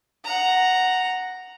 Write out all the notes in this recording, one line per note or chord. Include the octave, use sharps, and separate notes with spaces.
F#5 A#5